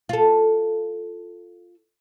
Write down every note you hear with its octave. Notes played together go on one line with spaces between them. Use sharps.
F4 A4